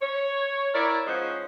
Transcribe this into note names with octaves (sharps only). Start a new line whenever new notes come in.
C#5
E4 A#4 C#5 D5
G#2 F3 C#4 C5 D#5 F#5